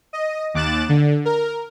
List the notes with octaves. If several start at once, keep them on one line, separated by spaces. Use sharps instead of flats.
D#5
D#2 D6 F#6 A6 E7
D3
A#4